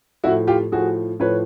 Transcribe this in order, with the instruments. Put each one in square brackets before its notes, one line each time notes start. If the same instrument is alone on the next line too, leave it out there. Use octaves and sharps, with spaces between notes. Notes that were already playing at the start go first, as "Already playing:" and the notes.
[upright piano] A2 F3 E4 F#4
F4 G4
A2 F3 F#4 G#4
A2 F3 B4 C#5